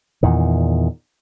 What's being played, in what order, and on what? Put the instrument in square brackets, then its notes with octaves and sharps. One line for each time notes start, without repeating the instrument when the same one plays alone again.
[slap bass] E2 A#2 D#3